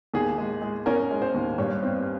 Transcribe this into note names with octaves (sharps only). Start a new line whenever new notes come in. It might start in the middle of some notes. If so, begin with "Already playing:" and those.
D#2 G#4
G#3
G#3
C#4 A#4
G#3
C5
D#2
G2 C#5
C4